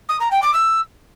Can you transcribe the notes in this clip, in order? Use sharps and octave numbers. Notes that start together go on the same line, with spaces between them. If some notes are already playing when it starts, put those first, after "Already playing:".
D#6
A#5
G5
D6
E6